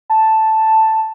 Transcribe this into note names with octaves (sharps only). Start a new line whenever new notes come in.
A5